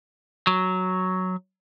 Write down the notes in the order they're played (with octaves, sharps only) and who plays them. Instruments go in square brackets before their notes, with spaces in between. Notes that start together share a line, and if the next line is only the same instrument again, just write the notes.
[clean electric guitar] F#3